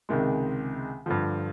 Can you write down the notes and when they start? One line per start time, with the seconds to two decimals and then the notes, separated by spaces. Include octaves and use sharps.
0.09 C#2 C3 D#3 G#3
1.06 G2 D3 F3